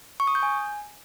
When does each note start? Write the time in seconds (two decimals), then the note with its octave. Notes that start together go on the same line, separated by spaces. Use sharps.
0.20 C#6
0.27 D#6
0.35 G6
0.43 G#5